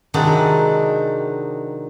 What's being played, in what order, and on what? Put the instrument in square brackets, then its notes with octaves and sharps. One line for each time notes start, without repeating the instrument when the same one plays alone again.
[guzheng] C3 D#3 F#3 G#3 D4